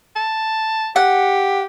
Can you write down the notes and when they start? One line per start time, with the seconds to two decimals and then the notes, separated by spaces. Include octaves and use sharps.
0.16 A5
0.96 G4 F#5